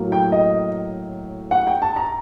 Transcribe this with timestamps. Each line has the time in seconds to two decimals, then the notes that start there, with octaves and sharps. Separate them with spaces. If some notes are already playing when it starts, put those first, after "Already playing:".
Already playing: A2 F#3 A#3
0.12 G5
0.32 D#5
1.51 F#5
1.67 G5
1.82 A5
1.96 A#5